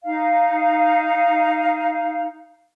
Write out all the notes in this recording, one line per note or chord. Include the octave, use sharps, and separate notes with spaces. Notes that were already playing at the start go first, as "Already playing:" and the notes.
D#4 F5